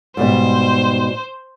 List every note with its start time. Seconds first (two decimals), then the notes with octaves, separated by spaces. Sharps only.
0.17 G#2 B2 G3 C5